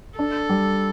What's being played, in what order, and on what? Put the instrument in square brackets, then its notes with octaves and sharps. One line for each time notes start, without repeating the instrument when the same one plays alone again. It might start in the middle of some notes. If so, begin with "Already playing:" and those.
[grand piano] D4 [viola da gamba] A4
[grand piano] G3